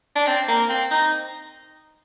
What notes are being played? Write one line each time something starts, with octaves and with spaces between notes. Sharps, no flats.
D4
C4
A#3
C4
D#4